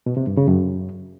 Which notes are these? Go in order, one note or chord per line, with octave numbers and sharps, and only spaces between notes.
B2
C3
G2
C#3
F#2